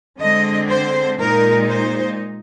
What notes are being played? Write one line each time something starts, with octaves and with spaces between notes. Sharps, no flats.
D3 G#3 C4 D#5
C5
A#2 G#3 D#4 A#4
C5